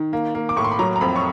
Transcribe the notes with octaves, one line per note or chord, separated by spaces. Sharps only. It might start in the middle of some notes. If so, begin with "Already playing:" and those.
Already playing: D#3
A#3
A#3
D6
A2 C#6
C6
B5
F#3 A#5
A#5
F2 B5
C#6